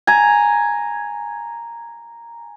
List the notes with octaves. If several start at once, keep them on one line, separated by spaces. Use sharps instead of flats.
G#5 A#5